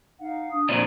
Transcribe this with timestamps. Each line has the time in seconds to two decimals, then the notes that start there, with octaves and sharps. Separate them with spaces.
0.20 D#4 F5 F#5
0.52 D4 D#6
0.69 F2 A#2 C5 D5 A#5